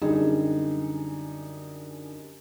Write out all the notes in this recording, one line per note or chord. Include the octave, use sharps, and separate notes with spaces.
F#2 D3 G3 D#4 G#4